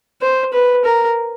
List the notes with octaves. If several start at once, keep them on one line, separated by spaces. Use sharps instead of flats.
C5
B4
A#4